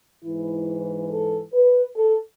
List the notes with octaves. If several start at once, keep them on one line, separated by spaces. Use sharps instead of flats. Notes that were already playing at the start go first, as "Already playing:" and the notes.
G#2 E3 E4
A4
B4
A4